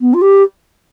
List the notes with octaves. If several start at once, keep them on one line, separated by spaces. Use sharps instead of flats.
B3
F4
G4